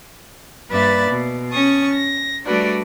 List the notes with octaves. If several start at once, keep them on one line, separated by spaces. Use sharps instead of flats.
G2 A#3 B4 D5 E5 A6
B2
C#4 A5 C#6 D#6
A#6
G3 A3 D4 F#4 B4 D5